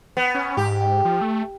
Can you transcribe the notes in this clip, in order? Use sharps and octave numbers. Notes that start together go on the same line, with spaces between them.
B3
C#4
G#2 G4
F3
A3